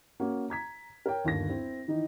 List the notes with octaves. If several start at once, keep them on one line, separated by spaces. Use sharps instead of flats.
A#3 C#4 F#4
A#5 G#6 B6
A#4 C#5 G5
G1 D#2 A#6
C4 E4
D#3 E3 D#4